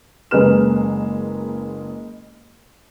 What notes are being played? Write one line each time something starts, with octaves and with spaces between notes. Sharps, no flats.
F#1 G#3 A#3 B4 F6 E7